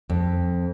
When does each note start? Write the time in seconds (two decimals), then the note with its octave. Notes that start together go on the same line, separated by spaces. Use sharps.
0.10 F2